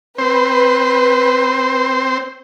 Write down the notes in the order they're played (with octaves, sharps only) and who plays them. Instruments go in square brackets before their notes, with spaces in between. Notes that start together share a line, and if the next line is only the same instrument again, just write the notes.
[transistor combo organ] C4 C5 [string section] B4